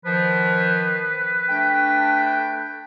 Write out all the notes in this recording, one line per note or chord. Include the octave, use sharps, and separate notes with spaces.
D#3 F3 B4
A3 D4 G5